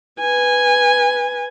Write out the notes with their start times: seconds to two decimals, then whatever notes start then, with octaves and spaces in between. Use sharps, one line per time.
0.20 B4 G#5